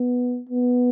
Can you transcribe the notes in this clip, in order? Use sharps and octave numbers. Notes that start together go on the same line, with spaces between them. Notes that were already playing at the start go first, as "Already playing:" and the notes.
Already playing: B3
B3